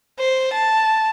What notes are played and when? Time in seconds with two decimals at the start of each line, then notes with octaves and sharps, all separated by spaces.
0.20 C5
0.54 A5